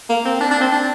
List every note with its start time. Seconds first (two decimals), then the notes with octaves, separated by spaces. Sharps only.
0.09 A#3
0.25 C4
0.40 D4
0.51 D4
0.61 C4
0.72 D4